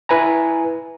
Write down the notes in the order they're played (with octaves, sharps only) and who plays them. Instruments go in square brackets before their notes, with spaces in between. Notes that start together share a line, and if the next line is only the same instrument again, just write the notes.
[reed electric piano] E4 B4 G#5 A#5